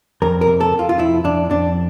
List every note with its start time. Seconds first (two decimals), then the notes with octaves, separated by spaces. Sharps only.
0.22 F2 A#4
0.41 A#4
0.47 C3
0.61 A4
0.72 C3
0.79 F4
0.89 F4
0.99 F2 E4
1.24 F2 D4
1.50 F2 D4